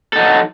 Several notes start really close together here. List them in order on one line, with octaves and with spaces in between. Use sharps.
A4 D#4 F#3